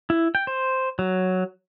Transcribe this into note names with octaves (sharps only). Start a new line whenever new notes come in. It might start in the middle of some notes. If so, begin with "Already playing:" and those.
E4
G5
C5
F#3